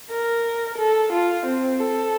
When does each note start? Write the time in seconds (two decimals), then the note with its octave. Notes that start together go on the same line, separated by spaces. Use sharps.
0.10 A#4
0.78 A4
1.12 F4
1.46 C4
1.79 A4